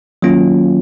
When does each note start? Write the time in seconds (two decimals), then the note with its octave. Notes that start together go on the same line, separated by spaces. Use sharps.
0.22 D#3 F#3 A#3 C#4 F4